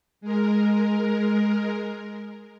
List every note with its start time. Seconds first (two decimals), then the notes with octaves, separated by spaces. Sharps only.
0.21 G#3 A#4